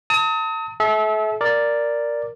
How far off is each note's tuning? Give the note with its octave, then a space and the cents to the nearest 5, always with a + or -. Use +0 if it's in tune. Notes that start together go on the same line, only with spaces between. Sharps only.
A5 +40 D#6 +35
A4 -40 E5 -25
A#4 +0 D5 +0